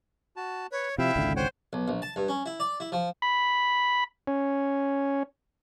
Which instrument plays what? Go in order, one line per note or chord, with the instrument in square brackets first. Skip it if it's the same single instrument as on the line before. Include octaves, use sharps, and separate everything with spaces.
[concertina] F#4 A5
[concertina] B4 [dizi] C#5
[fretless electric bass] C3 F3 [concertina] E4 F5 G5 [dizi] E5
[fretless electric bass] G#1 C#2 D3
[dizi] C5 [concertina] C#5 F#5 G5
[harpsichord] B1
A#1
A5
G2
C#4
E4
D5
E4
F3
[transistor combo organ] B5
C#4